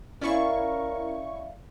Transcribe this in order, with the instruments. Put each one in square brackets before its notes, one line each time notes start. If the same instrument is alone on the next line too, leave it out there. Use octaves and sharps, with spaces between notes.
[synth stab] C#4 E4 C#6 [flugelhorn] A#4 [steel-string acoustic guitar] D5 E5 F5